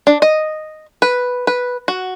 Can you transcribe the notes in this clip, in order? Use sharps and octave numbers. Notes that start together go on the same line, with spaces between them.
D4
D#5
B4
B4
F#4